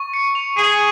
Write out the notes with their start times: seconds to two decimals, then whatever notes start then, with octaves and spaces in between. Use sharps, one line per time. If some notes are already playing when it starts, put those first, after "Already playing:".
Already playing: C#6
0.13 C#7
0.35 F7
0.57 G#4 D#7